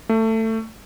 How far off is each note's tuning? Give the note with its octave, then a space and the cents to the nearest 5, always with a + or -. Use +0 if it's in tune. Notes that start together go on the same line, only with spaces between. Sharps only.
A3 +20